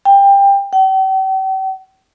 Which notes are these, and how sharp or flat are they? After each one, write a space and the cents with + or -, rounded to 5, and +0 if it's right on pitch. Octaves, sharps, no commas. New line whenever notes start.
G5 +20
G5 -45